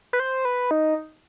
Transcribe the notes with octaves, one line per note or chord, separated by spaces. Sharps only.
B4
C5
B4
D#4